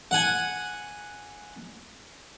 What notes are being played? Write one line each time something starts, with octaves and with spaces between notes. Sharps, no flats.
F#5 G#5